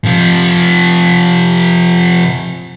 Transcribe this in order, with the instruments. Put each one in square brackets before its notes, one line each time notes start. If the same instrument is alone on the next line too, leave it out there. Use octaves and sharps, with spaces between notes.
[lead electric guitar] C3 F3